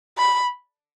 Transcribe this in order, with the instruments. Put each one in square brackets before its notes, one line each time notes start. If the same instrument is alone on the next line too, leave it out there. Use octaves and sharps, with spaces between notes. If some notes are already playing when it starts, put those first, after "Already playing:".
[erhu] B5